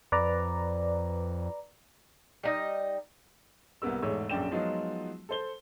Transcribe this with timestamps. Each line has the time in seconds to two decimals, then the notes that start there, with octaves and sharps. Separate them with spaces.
0.12 F2 B4 D5 A#5
2.43 G3 D#4 D#5
3.82 C2 A#3 B3 A#4 E6
4.02 E1 E2 G#2 A3 C#5 E6
4.29 A#1 F#2 D3 D5 G5 E7
4.51 F3 F#3 G#3 B3 D#4 F4
5.29 A4 C5 G7